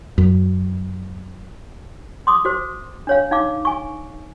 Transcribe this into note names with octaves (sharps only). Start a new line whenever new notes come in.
F#2
C6 D6 D#6
F#4 C5
D4 C#5 F5
D#4 F5 D6
G#5 C#6